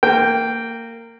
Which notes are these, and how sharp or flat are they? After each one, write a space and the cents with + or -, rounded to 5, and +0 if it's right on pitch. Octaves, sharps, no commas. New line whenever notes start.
A#3 -20 G5 +0